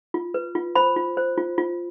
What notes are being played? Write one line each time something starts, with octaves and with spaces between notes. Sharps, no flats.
F4
B4
F4
C5 B5
F4
C5
F4
F4